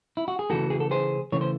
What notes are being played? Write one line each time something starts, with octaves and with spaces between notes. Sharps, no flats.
E4
F#4
G#4
C#3 E3 A3 F#4 A4
G#4
A4
G#4 C5
C#3 E3 A3 C#5
C5